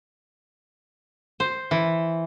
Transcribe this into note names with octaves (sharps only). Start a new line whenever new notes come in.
C5
E3